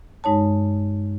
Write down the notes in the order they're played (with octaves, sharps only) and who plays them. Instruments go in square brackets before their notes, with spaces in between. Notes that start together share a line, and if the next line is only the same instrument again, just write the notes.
[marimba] G2 G#3 D#4 C#5 A5